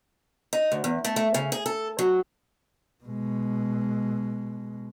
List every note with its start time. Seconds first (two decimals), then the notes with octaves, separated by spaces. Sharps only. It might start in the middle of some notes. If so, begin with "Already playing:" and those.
0.53 D#4
0.72 D2
0.84 E2
1.05 A3
1.16 A3
1.34 C#3
1.52 G#4
1.66 A4
1.99 F#3
3.05 B2 G#3